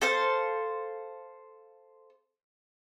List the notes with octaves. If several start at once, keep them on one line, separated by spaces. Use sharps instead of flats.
A4 C5 F5